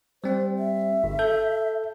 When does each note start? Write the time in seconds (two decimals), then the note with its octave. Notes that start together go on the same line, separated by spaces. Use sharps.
0.24 G3 C4 C5
0.59 E5
1.04 G1
1.19 A4 G6